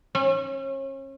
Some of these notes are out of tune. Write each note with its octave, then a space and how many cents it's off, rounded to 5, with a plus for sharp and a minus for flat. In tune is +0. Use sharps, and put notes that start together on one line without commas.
C#4 -35